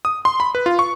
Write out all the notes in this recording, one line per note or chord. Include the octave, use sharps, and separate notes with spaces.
D#6
C6
B5
B4
F4
C#6